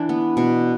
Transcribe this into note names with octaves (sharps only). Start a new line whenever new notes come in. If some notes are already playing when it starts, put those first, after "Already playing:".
Already playing: E3 D4
B3
B2